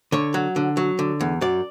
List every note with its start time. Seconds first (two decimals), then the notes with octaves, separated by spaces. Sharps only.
0.12 D3 C#5
0.34 F#3
0.56 D3
0.77 F#3
0.99 D3
1.21 E2
1.41 F#2 D5